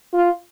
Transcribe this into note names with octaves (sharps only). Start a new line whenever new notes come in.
F4